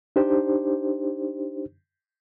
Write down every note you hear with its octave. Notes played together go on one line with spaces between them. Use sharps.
D4 D#4 G4 C5